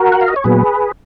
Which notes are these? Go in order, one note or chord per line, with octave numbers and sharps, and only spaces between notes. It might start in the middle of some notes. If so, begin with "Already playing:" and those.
Already playing: F#4 A#4
F#5
F5
D#5
C#5
A#2 F#3 B3 G#4 B4